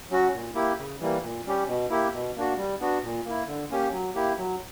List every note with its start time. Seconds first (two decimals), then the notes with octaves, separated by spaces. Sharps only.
0.10 F#3 C#4 F#4
0.32 A#2
0.55 A#3 E4 G4
0.78 C#3
1.00 E3 G3 A#3
1.23 A#2
1.46 G3 C#4 G4
1.68 B2
1.90 A#3 E4 G4
2.13 B2
2.36 A#3 D4 F#4
2.57 G3
2.80 B3 D4 F#4
3.03 A#2
3.25 A#3 E4
3.47 D3
3.70 A#3 C#4 G4
3.92 F#3
4.15 A#3 E4 G4
4.38 F#3